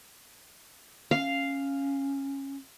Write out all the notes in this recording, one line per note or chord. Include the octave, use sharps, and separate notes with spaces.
C#4 F5